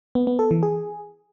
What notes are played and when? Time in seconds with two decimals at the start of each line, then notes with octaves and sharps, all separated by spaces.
0.15 B3
0.27 B3
0.39 A4
0.51 E3
0.63 G#4